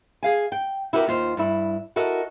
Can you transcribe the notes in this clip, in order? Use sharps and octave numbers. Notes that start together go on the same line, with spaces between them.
G#4 F5 G#5
G5
E4 F#4 G4 A#4 B4
D#2 F4 C5
G2 E4
E4 F#4 A4 A#4 D#5